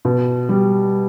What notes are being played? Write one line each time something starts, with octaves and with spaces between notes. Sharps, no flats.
B2
G3